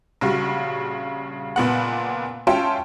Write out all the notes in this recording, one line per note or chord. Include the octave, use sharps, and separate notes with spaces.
A#1 C#3 G3 F#4
F#1 A#2 B3 F#5
C#4 F4 E5 G5 A5 C6